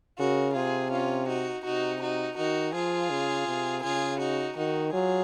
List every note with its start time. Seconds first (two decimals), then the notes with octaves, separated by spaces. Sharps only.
0.19 C#3 F#4 A#4
0.55 C3 F4 G#4
0.92 C#4 F4
1.28 D#4 F#4
1.65 C3 D#4 F#4
2.01 D#4 F#4
2.37 D#3 D#4 F#4
2.74 F3 F4 G#4
3.10 C#3
3.47 C3
3.83 C#3 F4 G#4
4.20 D#4 F#4
4.56 D#3 D#4 F#4
4.93 F#3 F4 G#4